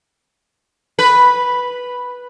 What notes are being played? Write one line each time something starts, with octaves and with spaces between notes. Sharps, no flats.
B4